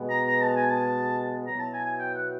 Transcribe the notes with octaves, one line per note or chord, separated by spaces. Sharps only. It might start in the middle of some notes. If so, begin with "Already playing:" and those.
Already playing: B2 G#3 B3
A#5
A#5
A5
G#5
A5
B2 F#3 B3 E4 A#5
A5
G#5
G#5
G5
F#5